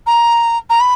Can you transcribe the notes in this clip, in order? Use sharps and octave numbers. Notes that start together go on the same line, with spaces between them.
A#5
A#5
B5